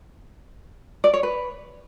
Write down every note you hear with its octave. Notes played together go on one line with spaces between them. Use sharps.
D5
C#5
B4